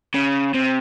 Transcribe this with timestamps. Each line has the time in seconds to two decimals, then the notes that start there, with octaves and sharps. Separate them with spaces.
0.14 C#3
0.54 C3